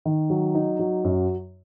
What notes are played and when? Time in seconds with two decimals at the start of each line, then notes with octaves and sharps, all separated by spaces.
0.05 D#3
0.30 F#3
0.55 D#4
0.79 F#3
1.04 F#2